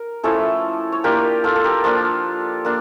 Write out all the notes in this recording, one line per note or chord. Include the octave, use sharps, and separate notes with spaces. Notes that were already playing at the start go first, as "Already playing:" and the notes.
Already playing: A#4
F3 A3 C#4 E4 A4 C#5
C#5
A#3 D4 F4 G4 A#4
F4 A4
A4
G4 A#4
F3 A#3 D4 F4 A4
A#3 D4